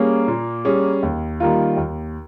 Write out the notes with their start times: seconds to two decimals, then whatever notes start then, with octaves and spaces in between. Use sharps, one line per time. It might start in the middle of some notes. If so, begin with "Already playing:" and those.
Already playing: G3 A#3 C#4 G#4
0.28 A#2
0.65 G3 C#4 G#4
1.03 D#2
1.40 D#3 G3 A#3 F4
1.77 D#2